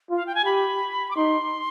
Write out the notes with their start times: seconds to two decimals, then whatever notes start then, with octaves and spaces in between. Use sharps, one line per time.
0.10 F4
0.16 F5
0.27 G5
0.35 G#5
0.45 G4 B5
1.11 D6
1.16 D#4 C6